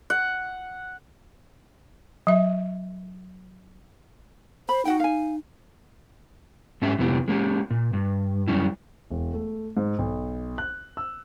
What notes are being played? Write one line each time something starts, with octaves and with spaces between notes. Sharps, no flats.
F#5
F#3 E5
C5 B5
D#4 F#4 F#5 G5
F5 G#5
G#2 A3 C#4 G4 E5
F2 C3 B3 E4 G4
G#3 A#3 C#4 G4
A#2
G2
F#2 B2 G3 C#4 E4
E1
A3
G#2
B1
F#6
E6